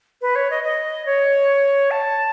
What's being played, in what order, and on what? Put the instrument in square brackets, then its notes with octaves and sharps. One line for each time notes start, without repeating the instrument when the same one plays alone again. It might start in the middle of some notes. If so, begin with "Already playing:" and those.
[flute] B4
C#5
D#5
D#5
C#5
A5